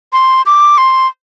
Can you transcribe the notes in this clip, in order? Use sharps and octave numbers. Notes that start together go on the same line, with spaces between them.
C6
D6
C6